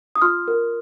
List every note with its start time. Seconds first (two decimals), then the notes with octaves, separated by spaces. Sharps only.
0.16 D#6
0.22 F4 C6 F6
0.48 A#4